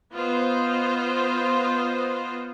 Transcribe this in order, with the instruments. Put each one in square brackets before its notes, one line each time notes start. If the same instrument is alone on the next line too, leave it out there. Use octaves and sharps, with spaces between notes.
[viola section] B3 F4 C5 D#5